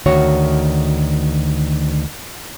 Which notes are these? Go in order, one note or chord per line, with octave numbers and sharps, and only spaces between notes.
D2 D#3 F#4 C#5